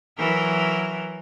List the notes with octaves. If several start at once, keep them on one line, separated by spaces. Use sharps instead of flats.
E3 F#3 A#4